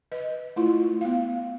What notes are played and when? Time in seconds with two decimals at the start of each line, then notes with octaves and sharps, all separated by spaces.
0.12 B4 D#5
0.56 A3 E4 F4
1.01 B3 F5